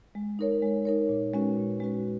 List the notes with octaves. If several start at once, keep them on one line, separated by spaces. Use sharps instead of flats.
G#3
D#4 A#4 C#5
G#3
D#4 A#4 C#5
A#2
G#3 C#4 F#4 B4
A#2
G#3 C#4 F#4 B4